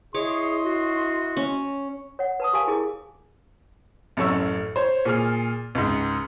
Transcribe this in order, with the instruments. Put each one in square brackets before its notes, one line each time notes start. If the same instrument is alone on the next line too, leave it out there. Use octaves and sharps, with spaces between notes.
[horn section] E4 D#5 C6 [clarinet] G#4 [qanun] C#5 D6
[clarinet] F#4
[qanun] C#4
[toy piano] C#5 F#5
B4 A5 D#6
G4 A#4 F5 G#5 A5
E4 G#4 A#4 D6
[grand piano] A1 F#2 A3 C#5 C#6 E6
C5 C#5
A#2 G#4 F6
C#2 G#2